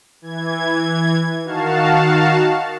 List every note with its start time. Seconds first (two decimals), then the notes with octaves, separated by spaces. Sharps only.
0.22 E3 G#6
1.43 D#3 F#4 F5 A5